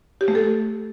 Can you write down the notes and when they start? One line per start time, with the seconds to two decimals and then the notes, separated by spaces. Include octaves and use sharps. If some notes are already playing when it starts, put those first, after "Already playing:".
0.21 G4
0.28 A3
0.35 A4